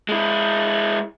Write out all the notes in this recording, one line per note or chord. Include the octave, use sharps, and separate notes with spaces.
G#3 E4